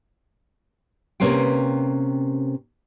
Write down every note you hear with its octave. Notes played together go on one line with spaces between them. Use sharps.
C3 A#3 C#4 B4 C5 G5